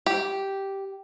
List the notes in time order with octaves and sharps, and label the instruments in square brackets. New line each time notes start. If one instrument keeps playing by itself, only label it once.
[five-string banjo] G4